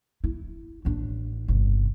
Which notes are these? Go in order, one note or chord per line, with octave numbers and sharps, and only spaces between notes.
E4
A1 D4
G1 C3